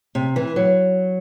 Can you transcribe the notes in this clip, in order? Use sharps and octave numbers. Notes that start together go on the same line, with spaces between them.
C3
E3
F#3